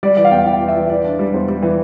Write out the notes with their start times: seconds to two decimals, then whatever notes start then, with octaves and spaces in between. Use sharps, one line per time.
0.03 G3 D5
0.17 E3 D5
0.25 F5
0.31 E2 G5
0.46 E3 G5
0.61 E3
0.68 E5
0.76 E3
0.89 E3 D5
1.04 D4
1.19 G3
1.34 E2 C5
1.48 G3
1.63 E3